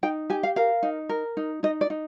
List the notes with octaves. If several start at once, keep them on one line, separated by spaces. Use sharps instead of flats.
D#4 G5
G4 G#5
F5
A#4 F5
D#4
A#4
D#4
D#4 D#5
D5
D#4